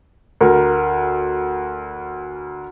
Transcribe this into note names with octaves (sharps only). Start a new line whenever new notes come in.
D2 A#4